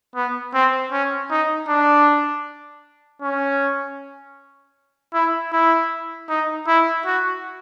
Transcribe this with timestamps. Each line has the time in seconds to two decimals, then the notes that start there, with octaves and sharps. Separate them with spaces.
0.15 B3
0.54 C4
0.92 C#4
1.30 D#4
1.68 D4
3.22 C#4
5.13 E4
5.52 E4
6.29 D#4
6.67 E4
7.06 F#4